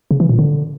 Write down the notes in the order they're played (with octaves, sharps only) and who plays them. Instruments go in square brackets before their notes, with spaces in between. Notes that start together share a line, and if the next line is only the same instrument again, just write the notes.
[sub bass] C#3
E3
A#2
D3